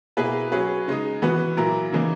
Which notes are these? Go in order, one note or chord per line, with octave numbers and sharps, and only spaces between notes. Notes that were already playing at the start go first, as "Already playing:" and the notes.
B2 A#3 E4 G#4 B4
F#3 C#4 G#4 B4
C#3 G#3 D#4
E3 B3 F#4 B4
A#2 F#3 A#3 E4 A#4
C#3 E3 A#3 D#4